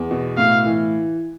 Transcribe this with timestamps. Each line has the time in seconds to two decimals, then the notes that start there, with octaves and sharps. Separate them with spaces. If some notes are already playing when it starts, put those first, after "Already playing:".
Already playing: E2
0.11 B2
0.37 A2 F5
0.66 E3